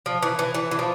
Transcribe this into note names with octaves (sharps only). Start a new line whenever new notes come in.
F3
E3
E3
E3
E3
F3